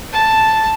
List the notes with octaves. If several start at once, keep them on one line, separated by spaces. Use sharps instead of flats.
A5